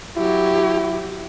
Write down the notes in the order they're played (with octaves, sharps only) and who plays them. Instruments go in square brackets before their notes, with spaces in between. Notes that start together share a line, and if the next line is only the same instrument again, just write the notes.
[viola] F#3 G4 [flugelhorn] E4